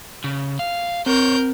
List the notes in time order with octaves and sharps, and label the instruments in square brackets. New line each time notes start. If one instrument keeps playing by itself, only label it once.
[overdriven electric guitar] C#3
F5
[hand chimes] C4 [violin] A#4 G6 [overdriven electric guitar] C5 C#5